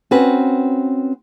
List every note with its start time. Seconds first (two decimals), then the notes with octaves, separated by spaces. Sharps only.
0.11 C4 C#4 F#4 B4